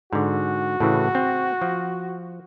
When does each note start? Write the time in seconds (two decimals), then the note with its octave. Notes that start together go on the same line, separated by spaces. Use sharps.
0.13 G#2 D3 F#4
0.80 A2 C#3 E3
1.15 C4
1.62 F3